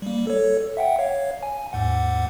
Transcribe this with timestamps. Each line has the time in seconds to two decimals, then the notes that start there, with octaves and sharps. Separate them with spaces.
0.02 G3 A#3
0.27 A4 C#5
0.77 E5 F#5 G5
0.99 C#5 F5
1.43 G#5
1.73 D#2 G#2 F#5